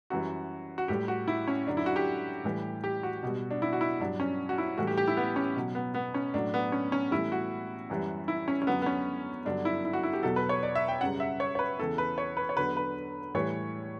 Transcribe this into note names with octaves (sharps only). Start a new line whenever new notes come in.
F#2 E3 G3 F#4
F#4
A2 G3 G4
F#4
E4
C#4
F#2 D3 F#3 D4
E4
F#4
G4
A2 E3 G3
G4
F#4
B2 G3
D4
E4
F#4
E4
G2 F#3 D4
C#4
F#4
E4
A2 E3 G3 F#4
G4
G4
E4
B3
C#4
B2 F#3
B3
B3
C#4
A2 F#3 D4
B3
C#4
C#4
A2 E3 G3 E4
F#4
F#2 E3 G3
E4
C#4
C#4
F#2 D3 F#3 B3
B3
C#4
G2 D3 F#3 D4
E4
E4
F#4
E4
G4
E2 B2 F#3 A4
B4
C#5
D5
E5
G5
F#2 C#3 G3 F#5
E5
C#5
C#5
B4
E2 C#3 E3 A4
B4
C#5
B4
C#5
E2 D3 F#3 B4
B4
A2 E3 G3 C#5